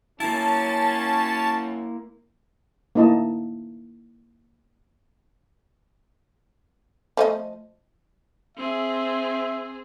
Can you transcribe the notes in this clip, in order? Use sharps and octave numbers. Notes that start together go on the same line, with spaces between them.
F#2 A#3 C#4 E4 A5
A#3 D#4 E4 D#5 A5
F3 A3 D#5
C4 G#4 E5